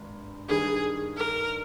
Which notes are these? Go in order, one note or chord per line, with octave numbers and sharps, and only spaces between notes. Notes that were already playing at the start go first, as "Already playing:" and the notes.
Already playing: G#1 G2
G2 D#3 G3 G#4
A#4